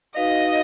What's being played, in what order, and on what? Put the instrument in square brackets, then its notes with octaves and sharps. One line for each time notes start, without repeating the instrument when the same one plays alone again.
[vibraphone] D#4 F#4 B4 F5 [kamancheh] D#5